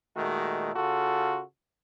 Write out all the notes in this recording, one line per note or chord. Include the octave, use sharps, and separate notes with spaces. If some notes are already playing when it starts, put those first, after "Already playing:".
A#2 D#3 G#3 A3 F#4
C#3 F4 F#4 A4